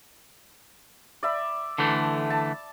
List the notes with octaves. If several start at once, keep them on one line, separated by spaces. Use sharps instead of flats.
D5 E5 B5
D3 E3 A3
A5